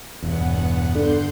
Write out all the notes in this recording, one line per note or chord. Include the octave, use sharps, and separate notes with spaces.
E1 E2 G2 B3 F#5
D3 C6 G6